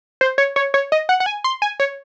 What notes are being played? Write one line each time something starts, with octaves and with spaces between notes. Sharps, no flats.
C5
C#5
C#5
C#5
D#5
F#5
F#5
G#5
C6
G#5
C#5